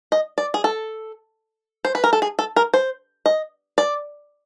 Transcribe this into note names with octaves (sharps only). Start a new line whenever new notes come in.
D#5
D5
G#4
A4
C5
B4
A#4
A4
G#4
A4
A#4
C5
D#5
D5